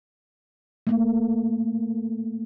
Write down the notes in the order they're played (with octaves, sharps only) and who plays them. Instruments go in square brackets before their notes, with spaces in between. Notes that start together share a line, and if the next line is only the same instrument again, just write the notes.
[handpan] A3 A#3